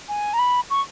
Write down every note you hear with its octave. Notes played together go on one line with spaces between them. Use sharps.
G#5
A#5
B5
C#6